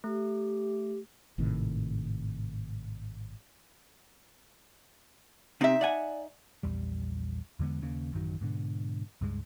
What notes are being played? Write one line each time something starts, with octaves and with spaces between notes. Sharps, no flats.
A3 G4
G#1 A2 C3 D#3
C3 C4 D#4 E5
D5 F#5 G#5
A#1 E2 G3
E2 D3 G#3 B3
D#2 C#3 A#3
A1 F#2 D#3 F#3
G#2 B2 D3
C#2 G2 G#3